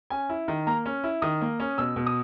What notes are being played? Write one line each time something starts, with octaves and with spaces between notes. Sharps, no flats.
C#4 G#5
E4
D#3
A#3 A#5
C#4
E4
D#3 D#6
A#3
C#4
B2 E6
B2
D#6